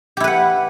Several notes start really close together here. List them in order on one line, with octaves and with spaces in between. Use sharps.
G4 E4 B4 F#5